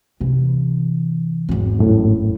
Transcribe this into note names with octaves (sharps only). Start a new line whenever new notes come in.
C3 E3
G#1 E2
F#2 A2